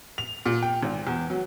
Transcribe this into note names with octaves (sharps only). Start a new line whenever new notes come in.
F7
A#2
G5
G#1
E2
F#3